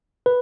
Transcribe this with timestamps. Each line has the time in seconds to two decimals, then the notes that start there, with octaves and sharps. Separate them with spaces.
0.26 B4